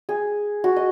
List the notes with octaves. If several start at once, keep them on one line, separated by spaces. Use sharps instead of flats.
G#4
F#4
D#5